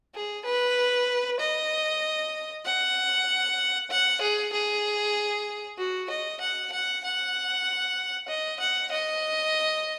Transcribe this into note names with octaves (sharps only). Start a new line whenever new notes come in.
G#4
B4
D#5
F#5
F#5
G#4
G#4
F#4
D#5
F#5
F#5
F#5
D#5
F#5
D#5